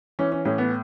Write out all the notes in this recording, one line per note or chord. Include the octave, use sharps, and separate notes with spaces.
E3 C#4
C#4
A2 C#4
B3